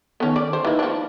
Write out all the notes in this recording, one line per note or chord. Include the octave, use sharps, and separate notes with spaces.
D#3 B3 C#4 A4
D5
C5
E3 A#3 D#4 E4 B4
F3 D4